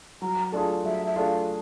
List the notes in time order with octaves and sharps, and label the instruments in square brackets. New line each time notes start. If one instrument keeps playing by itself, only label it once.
[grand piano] F#3 [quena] A#5
[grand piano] A3 D4 F4 G#4 [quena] A5
[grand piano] F#3 [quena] E5
[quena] E5
[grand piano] A3 D4 F4 G#4 [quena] F5